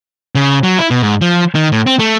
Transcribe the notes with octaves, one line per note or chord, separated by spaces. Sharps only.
C#3
F#3
E4
B2
G#2
F3
D#3
A2
C4
A3